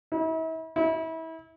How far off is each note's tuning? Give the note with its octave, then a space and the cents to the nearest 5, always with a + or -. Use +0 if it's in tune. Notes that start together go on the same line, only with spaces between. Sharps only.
E4 -40
E4 -30